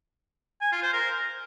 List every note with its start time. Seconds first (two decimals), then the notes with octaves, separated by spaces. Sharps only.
0.61 G#5
0.72 F4
0.82 C5
0.93 A#4